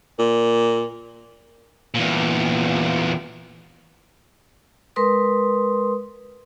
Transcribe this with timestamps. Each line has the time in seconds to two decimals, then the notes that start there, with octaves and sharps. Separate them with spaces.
0.19 A#2
1.94 E2 A#2
4.96 G#3 A#4 B4 C6 D#6